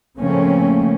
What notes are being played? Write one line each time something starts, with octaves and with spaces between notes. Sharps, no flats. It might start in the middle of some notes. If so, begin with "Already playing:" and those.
C#3 F3 A3 A#3 C4 C#4